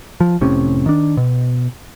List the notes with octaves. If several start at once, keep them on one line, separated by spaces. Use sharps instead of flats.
F3
F1 A2 C3 C#4
D#3 D4
B2